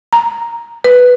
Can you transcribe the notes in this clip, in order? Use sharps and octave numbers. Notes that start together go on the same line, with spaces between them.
A#5
B4